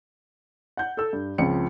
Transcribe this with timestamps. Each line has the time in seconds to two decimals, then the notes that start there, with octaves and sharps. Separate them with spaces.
0.77 F#5 G6
0.97 A4 E6
1.13 G2
1.38 C#2 F3 C4 C#7